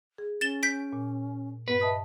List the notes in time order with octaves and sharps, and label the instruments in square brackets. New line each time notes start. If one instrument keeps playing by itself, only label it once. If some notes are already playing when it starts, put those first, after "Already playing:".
[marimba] G#4
[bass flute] C#4 [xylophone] A6 E7 G7
[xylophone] G6 B6 D7
[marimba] A#2
[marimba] G2 [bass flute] B3 [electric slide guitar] B4
[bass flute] D#5 [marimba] E5 A5 D#6